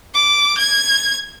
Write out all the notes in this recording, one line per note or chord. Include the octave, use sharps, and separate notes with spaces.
D6
G#6